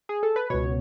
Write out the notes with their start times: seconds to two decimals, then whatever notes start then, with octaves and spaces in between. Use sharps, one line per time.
0.09 G#4
0.23 A4
0.36 B4
0.50 C#2 B2 C#5